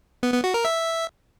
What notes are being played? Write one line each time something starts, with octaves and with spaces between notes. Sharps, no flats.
B3
B3
F#4
A#4
E5